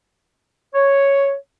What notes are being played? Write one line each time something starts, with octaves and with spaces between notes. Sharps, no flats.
C#5